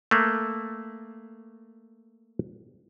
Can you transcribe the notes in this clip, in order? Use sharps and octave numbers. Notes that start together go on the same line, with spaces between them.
A3 A#3